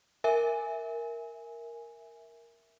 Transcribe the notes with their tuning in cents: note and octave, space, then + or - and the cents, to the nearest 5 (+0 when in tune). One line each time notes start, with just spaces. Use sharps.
A#4 +0 E5 +0 G#5 +0